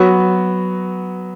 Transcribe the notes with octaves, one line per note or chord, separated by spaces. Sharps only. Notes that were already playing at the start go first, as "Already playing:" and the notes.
Already playing: F#3 B3 F#4